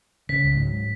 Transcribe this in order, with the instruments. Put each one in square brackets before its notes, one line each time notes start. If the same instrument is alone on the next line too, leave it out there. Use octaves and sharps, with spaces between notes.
[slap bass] C#3 [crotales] B6
[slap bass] C#2
G#2 F#3